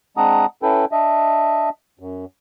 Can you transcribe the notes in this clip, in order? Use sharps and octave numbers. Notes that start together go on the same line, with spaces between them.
G#3 C4 D4 F#5 A#5 D#6
C#4 E4 A4 B4 G5
D4 D#5 E5
F#2